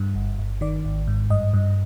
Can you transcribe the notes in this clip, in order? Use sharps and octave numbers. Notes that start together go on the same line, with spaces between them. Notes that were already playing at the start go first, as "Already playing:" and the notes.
Already playing: G2
G1
G1
D#3 D5
G#1
G#2
G2 D#5
G2